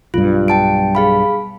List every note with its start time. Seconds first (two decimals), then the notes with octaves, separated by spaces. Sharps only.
0.14 B1 G2 F4
0.48 G5 A5 D7
0.95 G#4 F5 B5